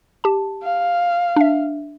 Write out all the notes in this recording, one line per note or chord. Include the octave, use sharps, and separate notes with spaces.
G4 A5
F5
D4 E5